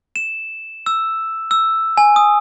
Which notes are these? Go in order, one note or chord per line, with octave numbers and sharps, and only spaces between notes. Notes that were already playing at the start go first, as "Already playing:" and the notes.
E7
E6
E6
G#5
D#6